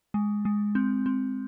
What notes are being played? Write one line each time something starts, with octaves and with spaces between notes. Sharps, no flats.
G#3
G#3
C4
C4